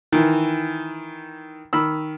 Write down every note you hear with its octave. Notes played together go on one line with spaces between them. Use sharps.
D#3 E3
D#3 B5 E6